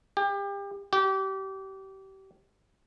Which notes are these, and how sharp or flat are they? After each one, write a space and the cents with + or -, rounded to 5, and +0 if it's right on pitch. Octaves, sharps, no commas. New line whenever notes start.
G4 +30
G4 -30